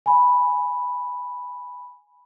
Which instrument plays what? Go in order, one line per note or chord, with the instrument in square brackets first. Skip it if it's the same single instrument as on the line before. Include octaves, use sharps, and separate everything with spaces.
[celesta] G#5 B5